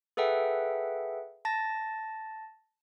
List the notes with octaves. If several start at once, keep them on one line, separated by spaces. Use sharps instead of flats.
G#4 A4 B4 E5 F#5 G5
A5 A6 A#6